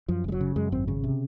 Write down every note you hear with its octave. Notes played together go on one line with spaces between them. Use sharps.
F#2 F3
F#1 G#3
F#3
C#3
F#2 G#3
G#1 C4
C#3 C#4
C3